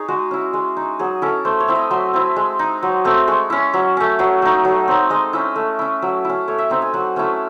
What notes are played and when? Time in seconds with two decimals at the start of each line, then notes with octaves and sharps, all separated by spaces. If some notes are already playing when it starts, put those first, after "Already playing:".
Already playing: D#4 G#4 C#5
0.08 G#3 F#4
0.31 C#4 E4
0.53 G#3
0.77 D#4
0.99 F#3 G#4
1.22 C#4 E4 A4
1.45 A3 C5
1.60 C#5
1.68 C4 E4
1.75 D#5
1.91 F#3 C6
2.13 C4 E4
2.36 G#3
2.59 D#4
2.83 F#3
3.05 A3 C4
3.28 G#3 C#6
3.50 C#4 E4
3.74 F#3
3.97 A3 C#4
4.19 F#3 C#6
4.42 A3 D#4
4.65 F#3
4.88 C4 D#4
5.10 G#3 D#5
5.33 C#4 E4
5.56 A3
5.79 C#4 E4
6.02 F#3
6.25 C#4 E4
6.48 A3 C#5
6.58 E5
6.70 C4 D#4 E5
6.82 G#5
6.94 F#3 F#5
7.16 A3 C#4 E4